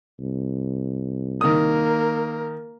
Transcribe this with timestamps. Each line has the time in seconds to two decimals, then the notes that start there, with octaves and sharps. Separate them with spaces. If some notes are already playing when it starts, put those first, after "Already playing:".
0.20 C2
1.41 D#3 A#3 A#4 D#6